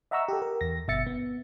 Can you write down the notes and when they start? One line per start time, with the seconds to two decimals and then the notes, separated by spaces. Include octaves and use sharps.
0.11 D#5 E5 F#5 A#5 C#6 E6
0.28 G4 A4
0.42 A#4
0.61 E2 A#6
0.88 G1 B2 E5 A6 C#7
1.07 B3